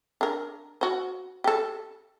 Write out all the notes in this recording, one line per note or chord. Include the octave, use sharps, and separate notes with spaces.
D4 A#4
F#4 C5
G4 A4